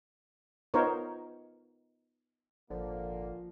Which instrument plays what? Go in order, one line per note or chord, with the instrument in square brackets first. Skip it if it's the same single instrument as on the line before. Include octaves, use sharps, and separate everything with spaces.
[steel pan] B3 D#4 F4 A#4 C5 C#5
[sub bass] G#1 [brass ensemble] A#2 A#3 [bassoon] D3 [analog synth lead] F3